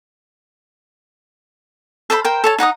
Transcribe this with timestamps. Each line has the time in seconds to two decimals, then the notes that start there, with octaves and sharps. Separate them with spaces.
2.10 A4 C5 D5 B5
2.25 A#4 C5 G5
2.44 A4 C#5 A5
2.58 D#4 F#5 A#5 D#6